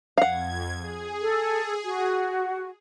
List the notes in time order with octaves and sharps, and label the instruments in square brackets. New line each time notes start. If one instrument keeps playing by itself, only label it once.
[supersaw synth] F2 G#6 [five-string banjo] F5 F#5
[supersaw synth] G#4
[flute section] A4
F#4